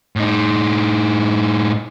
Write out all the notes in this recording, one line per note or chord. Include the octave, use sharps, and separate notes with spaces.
A2 D#4